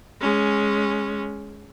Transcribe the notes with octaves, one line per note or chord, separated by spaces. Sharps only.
G#3 C#4